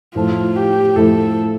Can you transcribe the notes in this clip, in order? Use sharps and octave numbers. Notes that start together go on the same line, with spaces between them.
A2 F3 A3 E4 F4
G4
A2 F3 A3 E4 A4